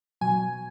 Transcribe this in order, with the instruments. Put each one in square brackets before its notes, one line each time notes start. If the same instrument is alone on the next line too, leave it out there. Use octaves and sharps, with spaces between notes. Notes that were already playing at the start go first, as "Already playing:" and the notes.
[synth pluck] B2 F#3 G#5